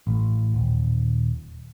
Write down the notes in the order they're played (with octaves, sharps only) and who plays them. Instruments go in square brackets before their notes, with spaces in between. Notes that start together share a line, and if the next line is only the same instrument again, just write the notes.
[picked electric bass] A1
D#1